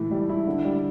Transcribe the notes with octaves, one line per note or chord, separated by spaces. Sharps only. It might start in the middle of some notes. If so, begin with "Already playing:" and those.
Already playing: A2 E3 E4
G3
E4
D3
G3